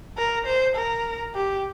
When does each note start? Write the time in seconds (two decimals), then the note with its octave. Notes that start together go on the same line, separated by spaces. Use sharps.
0.18 A#4
0.47 C5
0.75 A#4
1.35 G4